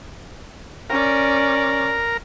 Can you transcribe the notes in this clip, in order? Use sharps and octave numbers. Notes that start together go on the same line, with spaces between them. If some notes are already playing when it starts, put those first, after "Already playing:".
C#4 A#4 D5